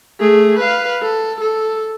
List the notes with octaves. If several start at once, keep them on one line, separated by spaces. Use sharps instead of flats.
A3 G#4
B4 F5
A4
A4